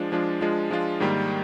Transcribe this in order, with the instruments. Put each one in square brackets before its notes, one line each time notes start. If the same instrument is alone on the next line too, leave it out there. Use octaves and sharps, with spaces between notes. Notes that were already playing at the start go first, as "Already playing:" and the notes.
Already playing: [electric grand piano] F3 G#3 D4 F4
F3 G#3 D4 F4
F3 G#3 D4 F4
F3 G#3 D4 F4
G#2 D#3 G3 A#3